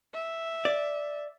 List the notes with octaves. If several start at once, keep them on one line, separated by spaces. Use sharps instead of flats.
E5
D5